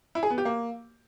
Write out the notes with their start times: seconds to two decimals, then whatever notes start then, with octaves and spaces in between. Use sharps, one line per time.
0.15 E4
0.23 G#4
0.30 B3
0.38 G4
0.45 A#3